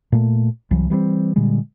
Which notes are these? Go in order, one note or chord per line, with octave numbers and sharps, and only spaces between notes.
A#2 A3
C2 E3 F#3
E3 G3 A3 C4
A#2 D3 G3 G#3